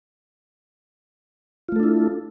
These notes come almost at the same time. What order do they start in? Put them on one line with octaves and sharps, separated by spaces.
F4 A3 A4 D4 E4